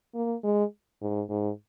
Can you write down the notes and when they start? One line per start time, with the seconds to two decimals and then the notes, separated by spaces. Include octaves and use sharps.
0.15 A#3
0.44 G#3
1.02 G#2
1.30 G#2